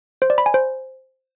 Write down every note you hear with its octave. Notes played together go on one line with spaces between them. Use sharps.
C5
D5
B5
G#5
C5